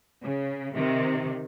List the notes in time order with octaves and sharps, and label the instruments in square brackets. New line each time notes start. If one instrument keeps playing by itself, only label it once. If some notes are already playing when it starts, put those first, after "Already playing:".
[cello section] C#3
C3 D#3